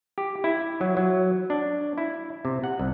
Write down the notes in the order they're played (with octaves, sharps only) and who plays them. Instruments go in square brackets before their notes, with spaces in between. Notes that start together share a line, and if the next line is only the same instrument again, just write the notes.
[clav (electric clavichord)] G4
E4
F#3
F#3
D4
E4
C3
F#5
C2